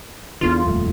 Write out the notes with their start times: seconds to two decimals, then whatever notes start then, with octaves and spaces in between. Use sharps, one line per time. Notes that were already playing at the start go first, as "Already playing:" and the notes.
0.41 E2 D3 E3 F4
0.63 D#1 F2 A3